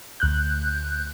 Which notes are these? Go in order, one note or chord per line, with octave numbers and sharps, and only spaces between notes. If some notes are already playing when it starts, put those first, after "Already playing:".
D2 F#6 G6